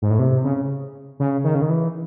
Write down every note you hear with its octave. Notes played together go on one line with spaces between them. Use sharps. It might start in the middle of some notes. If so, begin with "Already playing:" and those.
G#2
A2
C3
C#3
C#3
D#3
C#3
D#3
E3